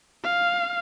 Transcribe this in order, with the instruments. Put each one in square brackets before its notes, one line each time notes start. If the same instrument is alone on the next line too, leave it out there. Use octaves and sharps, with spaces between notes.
[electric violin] F5